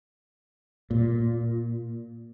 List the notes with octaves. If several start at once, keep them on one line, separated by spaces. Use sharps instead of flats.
A#2